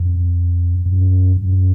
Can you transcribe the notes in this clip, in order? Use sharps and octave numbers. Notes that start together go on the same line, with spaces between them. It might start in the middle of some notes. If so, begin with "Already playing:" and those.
Already playing: F2
F#2
F#2